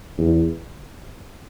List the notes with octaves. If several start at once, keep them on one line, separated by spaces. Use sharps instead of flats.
E2